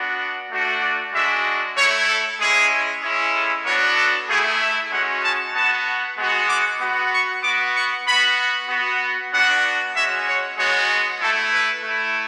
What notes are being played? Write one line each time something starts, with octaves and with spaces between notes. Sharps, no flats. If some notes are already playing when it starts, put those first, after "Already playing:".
Already playing: B3 D4 F#4
A3 D4 F#4
D5
G#3 D4 F#4 E5
A3 E4 C#5
A4
G#3 C#4 E4 G#4
G#3 C#4 E4
A4
B3 D4 F#4 C#5
A4
A3 E4 G#4
E5
G#3 C#4 F#4 F#5
A5
B3 F#4 A5
G#3 B3 F#4
D6
B3 F#4
C#6
B3 F#4 D6
C#6
B3 F#4 B5
B3 F#4
B3 D4 F#4 F#5
G#3 C#4 F#4 E5
C#5
G#3 B3 F#4 C#5
A3 E4 A4
B4
A3 E4